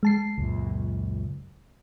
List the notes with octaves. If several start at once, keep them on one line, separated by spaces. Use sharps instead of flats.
G#3 A5 C7
C#2 F#2 A#2